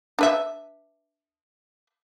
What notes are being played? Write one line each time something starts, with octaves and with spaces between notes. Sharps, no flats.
D4 B4 E5